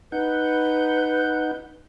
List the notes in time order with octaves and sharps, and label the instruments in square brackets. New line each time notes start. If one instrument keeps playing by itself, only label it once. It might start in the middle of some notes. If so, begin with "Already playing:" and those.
[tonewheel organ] D#4 F#5 G6 [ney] B4